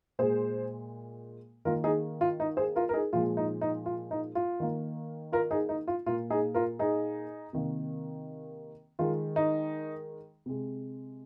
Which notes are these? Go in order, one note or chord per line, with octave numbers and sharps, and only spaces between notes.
A#2 G#3 G#4 C5
D#3 A#3 F4 A#4
D#4 G#4
F4
D#4
G#4 C5
F4 A#4
A#4
D#4 G#4
A#2 F3 G#3 F4
D#4
D#4
F4
D#4
F4
D#3 A#3
F4 A#4
D#4 G#4
D#4
F4
A#2 A#3 F4
D#4 G#4
F4 A#4
D#4 G#4
C3 D#3 A#3
D#3 G#3 F4
D#4
C3 G#3